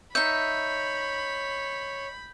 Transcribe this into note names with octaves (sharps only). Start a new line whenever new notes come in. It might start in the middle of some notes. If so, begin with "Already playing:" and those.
D#4 C#5 E5 B5 G6